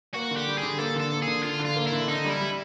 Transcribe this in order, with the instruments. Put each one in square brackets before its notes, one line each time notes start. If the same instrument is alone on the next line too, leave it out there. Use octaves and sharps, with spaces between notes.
[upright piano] A#3 [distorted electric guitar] F#4
[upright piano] D3
[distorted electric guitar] G4
[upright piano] G3
[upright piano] D3 [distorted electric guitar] G#4
[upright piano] A#3 [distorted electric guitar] A4
[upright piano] D3 [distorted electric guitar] A4
[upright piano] A#3
[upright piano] D3 [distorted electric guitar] G#4
[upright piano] D3 [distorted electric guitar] F4
[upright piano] D3
[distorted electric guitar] F4
[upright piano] A#3
[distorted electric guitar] E4
[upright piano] D3
[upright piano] D3 [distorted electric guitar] D#4
[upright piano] G3
[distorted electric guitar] E4
[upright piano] G3